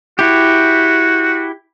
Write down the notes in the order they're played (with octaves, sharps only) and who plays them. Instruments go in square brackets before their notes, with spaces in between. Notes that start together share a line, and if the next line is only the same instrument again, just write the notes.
[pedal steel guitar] E4 G4 [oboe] F#4